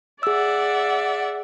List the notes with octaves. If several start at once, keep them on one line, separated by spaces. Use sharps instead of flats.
G#4 D5 E5 F#5 E6